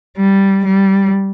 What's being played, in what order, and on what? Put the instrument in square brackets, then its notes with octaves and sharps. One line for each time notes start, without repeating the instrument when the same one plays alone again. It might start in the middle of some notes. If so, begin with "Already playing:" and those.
[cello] G3
G3